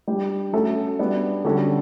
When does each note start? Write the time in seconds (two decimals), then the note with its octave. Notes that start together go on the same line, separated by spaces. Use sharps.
0.07 G3 D4 G4
0.53 F#3 A3 C#4 F#4 A4
0.99 G3 B3 D4
1.44 D3 G3 C#4 F#4 A4